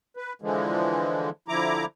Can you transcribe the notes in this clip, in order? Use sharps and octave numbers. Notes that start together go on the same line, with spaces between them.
B4
D3 E3 F3 G#3
D3 F3 E4 A#5 D6